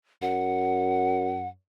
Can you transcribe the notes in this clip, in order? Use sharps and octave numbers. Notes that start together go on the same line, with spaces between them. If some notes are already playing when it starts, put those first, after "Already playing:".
F#2 F#5